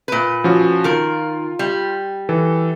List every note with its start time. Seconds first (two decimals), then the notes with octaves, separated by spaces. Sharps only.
0.08 A#2 B4
0.44 F3 C#4 F#4
0.84 D#3 F4 A#4
1.59 G3
2.29 E3 A4